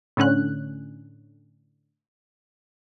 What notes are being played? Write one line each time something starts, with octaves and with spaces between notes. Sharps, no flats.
A2 D3 C#4 F#6